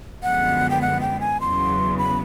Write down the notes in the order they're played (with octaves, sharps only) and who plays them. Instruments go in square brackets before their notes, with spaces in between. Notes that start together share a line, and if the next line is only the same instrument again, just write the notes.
[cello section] F#2 D3 F3 G#3 B3 [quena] F#5
[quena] G5
F#5
G5
G#5
[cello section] E2 C#3 F#3 B3 [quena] C6
[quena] B5